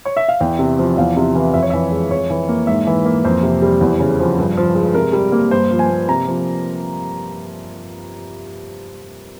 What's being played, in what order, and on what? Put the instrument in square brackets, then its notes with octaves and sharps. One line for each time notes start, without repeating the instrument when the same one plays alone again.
[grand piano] C#5
E5
F5
E2 G5
C3
F3
E2 F5
C3
E3
F2 E5
C#5
E3 E5
G#3
F2 C#5
E3
A#3
G#2 E5
E3
A#3
F2 C5
C3
G3
E2
C#3
F3
G2
F3
G#3
C3 A#4
G3
A#3
G2 C5
F3
G#5
A#3
C3 A#5
F3